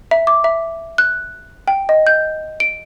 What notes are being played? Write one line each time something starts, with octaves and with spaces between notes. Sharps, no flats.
E5
D6
E5
F#6
G5
D#5
G6
D7